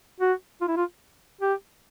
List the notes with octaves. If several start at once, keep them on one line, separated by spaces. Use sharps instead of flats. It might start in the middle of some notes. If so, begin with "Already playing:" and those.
F#4
F4
E4
F4
G4